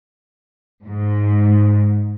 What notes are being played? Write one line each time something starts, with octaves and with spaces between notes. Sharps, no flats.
G#2